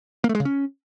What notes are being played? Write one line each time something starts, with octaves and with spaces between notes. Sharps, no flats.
A#3
A3
G#3
C#3
C#4